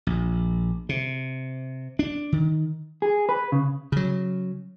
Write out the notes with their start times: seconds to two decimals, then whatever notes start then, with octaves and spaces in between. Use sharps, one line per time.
0.07 A#1
0.89 C3
1.99 D4
2.32 D#3
3.02 G#4
3.29 B4
3.52 C#3
3.92 C#3 F#3